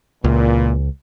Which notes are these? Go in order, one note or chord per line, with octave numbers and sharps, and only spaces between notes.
C#2 A#2 E3